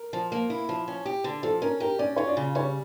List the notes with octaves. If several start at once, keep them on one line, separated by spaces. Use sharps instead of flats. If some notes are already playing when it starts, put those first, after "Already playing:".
Already playing: A#4
F3
A#3
E4
F3
C#4
G4
D3
F3 A4
C#4 A#4
G4 A#4
C#4 D5
F4 C#5
D5
C#3
G3 C#5